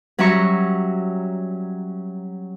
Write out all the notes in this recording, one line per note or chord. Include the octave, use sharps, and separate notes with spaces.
F#3 G3 C#4 E5 A#5 C#6